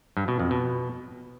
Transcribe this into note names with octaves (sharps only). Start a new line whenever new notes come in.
G2
B2
F2
B2